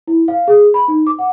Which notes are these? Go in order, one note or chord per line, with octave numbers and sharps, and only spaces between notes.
E4
F5
G#4
B5
D#4
D6
F#5